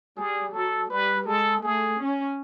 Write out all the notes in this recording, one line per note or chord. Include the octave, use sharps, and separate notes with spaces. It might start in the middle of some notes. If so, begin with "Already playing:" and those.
G3 G#4
F#3 A4
G3 B4
G#3 A4
A3 G#4
C#4